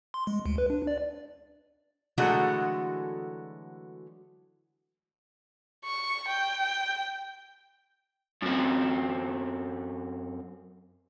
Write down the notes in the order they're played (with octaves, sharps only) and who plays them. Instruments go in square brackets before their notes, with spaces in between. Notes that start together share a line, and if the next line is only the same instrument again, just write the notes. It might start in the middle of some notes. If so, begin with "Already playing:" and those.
[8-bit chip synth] C6
G#3
D2
B4
D4
D5
[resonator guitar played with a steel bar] D3 E3 F#3 G#3 A3 F#4
[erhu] C#6
G5
[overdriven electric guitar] F#2 C4